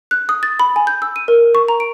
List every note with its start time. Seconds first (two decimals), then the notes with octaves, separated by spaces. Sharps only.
0.11 F#6
0.29 D#6
0.43 A6
0.60 B5
0.76 G#5
0.87 G6
1.02 E6
1.16 D#7
1.28 A#4
1.55 C#6
1.68 A#5
1.80 D7